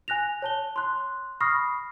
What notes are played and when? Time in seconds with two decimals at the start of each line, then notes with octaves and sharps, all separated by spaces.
0.08 G#5 F#6 A#6 F7
0.42 C#5 A5 G7
0.76 C6 F#6
1.40 B5 C#6 D#6 F6 A#6 C7